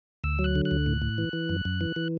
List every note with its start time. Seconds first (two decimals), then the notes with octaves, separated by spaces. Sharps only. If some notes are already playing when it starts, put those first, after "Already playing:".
0.24 D2 E6
0.39 F#3
0.44 F#6
0.55 D3
0.65 F#6
0.71 D2
0.86 A2
1.02 A2
1.18 E3
1.33 E3
1.49 F#2
1.65 F#2
1.81 E3
1.96 E3